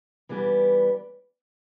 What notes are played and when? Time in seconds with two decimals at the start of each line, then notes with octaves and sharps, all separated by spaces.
0.29 E3 G3 B3 D4 G4